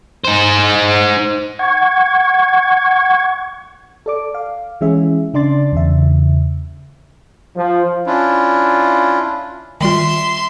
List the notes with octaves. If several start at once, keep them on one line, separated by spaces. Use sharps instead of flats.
D#4 C5
F#5 C#6 G#6
A4 D5 D6
F5
E3 G#3 C#4 G#4 E5
C#3 D4 D5 C6 A6
E2 C#3 E5
F3
C#4 D4 E4 F4
D#3 G3 F4 E5 C6